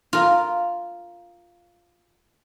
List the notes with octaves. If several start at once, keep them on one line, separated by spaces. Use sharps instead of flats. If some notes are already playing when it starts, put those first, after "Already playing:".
F4 A#4